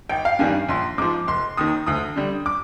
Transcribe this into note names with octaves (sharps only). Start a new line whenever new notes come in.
G#1 G5
F5
G2 D#3 G3 G#5
A#1 C6
G#2 F3 D6
F1 C6
D#2 D#3 D#6
D2 D#6
D3 G3
D6